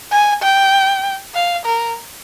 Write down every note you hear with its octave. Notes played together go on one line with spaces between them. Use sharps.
G#5
G5
F5
A#4